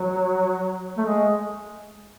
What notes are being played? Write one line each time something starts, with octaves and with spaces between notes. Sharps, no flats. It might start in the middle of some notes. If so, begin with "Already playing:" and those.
Already playing: F#3
A3
G#3